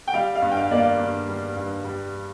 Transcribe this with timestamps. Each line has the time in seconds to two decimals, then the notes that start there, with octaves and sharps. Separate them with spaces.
0.07 G5
0.13 G3 F5
0.35 F5
0.42 G2
0.51 G5
0.57 F5
0.71 A#3 D5
0.78 F5
0.99 G2
1.28 G3
1.56 G2
1.84 G3